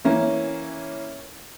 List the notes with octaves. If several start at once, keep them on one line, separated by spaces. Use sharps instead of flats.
E3 A#3 C#4